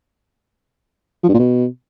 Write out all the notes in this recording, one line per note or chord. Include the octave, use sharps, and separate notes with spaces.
F3
G2
A#2
B2